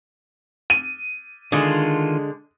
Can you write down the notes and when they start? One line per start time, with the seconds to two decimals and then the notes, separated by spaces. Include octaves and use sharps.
0.70 D#7
1.52 D3 D#3 G#3 F4